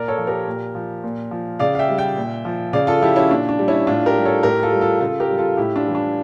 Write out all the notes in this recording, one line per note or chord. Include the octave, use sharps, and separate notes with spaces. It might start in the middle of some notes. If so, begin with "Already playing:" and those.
Already playing: A#2 A#4 D5
A4 C#5
F3
G4 A#4
A#2
F3
A#2
F3
C#3 D5 F5
F5
E5 G5
G3
E5 G5
A#2
F3
C#3 D5 F5
F4 A4
F3 E4 G4
C#4 E4
A#2 D4
D4
G3
C#4 E4
A2 D4 F4
G4 A#4
G3
A4 C#5
A2 G4 A#4
F4 A4
G3
F4 A4
C#3 F4 A4
G4 A#4
G3
F4 A4
A2 E4 G4
D4 F4
E3 G3
D4